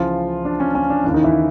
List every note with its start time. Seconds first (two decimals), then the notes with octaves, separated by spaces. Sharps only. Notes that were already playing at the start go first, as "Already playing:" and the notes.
Already playing: C#2 C#3 E3 F3 F4
0.45 D4
0.60 C#4
0.75 C#4
0.90 D4
1.04 D#2 C#3 E3 D4
1.14 D#3 D#4
1.24 E3 E4